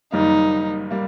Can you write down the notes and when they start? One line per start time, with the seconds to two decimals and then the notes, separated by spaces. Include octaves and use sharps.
0.12 F#1 F#2 D#3 G3 A#3 D#4
0.91 G3 A#3